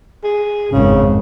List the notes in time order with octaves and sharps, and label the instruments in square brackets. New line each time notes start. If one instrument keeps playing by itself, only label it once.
[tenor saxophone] G#4
[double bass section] G#1 F2 [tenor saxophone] C#3